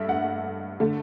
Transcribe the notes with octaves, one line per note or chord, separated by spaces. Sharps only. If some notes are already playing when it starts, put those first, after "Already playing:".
Already playing: G2 A3 E5
F#5
D3 A3